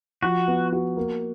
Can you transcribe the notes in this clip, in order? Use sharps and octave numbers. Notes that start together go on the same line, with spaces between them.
F3 F#4
B3
F#4
A#3